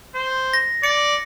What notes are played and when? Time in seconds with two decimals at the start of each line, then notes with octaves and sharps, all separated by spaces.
0.15 C5
0.53 A#6
0.83 D5 C#7